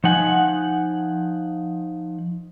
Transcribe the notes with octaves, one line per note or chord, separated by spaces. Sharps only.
F3 D#4 F#5 G#5